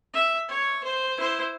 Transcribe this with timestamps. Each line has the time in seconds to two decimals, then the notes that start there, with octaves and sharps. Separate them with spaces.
0.13 E5
0.48 C#5
0.83 C5
1.17 E4 C5